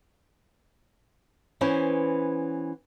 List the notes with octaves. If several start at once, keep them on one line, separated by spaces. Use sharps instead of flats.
E3 B3 C#4 C5